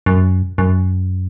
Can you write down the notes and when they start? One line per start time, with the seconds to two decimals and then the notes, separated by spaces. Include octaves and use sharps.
0.06 F#2
0.58 F#2